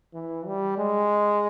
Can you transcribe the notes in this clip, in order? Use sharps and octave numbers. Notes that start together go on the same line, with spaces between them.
E3
G3
G#3